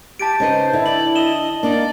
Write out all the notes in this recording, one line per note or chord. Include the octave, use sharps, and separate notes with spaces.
G4 A5 A6 D7
C#3 D#4 B4 C5
D3 E4
D5 F#7
D#5 E7 G7
A#3 D4 D#4 D5